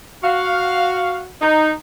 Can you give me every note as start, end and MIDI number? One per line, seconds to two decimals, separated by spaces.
0.24 1.31 66
0.24 1.19 77
1.42 1.72 63